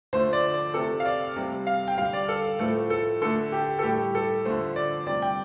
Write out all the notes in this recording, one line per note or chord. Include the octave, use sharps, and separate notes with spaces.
D3 F3 A3 C5
D5
D5
C3 A3 A4
F5
D5
C3 G3
F5
G5
D3 G3 F5
D5
A4
A2 F3 A3 A4
A4
D3 A3 A4
G4
A4
A2 G3 G4
A4
D3 F3 A3 C5
D5
C3 G3 D5
G5